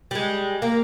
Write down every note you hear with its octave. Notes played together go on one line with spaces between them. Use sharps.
G3 G#3
A#3